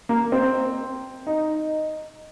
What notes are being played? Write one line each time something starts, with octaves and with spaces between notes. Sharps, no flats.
A#3
C4
D#4